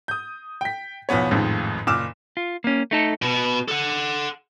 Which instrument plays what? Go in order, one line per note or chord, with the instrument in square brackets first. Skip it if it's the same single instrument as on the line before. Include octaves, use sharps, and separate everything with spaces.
[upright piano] D#6 G6
G5 B6
B1 E2 F3 B3 C#5
A1 F2 G#2 D#3 F3
F#1 A#2 D6 E6 F6 E7
[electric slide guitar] F4
A#3 C#4
A3 D#4 A4
[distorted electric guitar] B2
A4 F#5